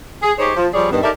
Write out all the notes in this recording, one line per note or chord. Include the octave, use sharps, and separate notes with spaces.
G#4
D#4 G4 G#4 C5 C#5
F3
F3 G3 G#4 C#5 D5
G2 D#3 B3
D#4 G4 A4 A#4 D5 E5